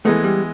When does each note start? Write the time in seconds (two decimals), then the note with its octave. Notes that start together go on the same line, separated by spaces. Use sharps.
0.05 E3 G#3 A3 B3
0.24 G3